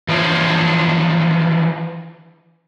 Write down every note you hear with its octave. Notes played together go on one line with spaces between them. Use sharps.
E3 F3 D4 C5 C#5